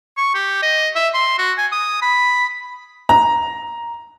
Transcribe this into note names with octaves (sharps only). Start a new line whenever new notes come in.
C#6
G4
D#5
E5
C6
F#4
G#5
D#6
B5
A#5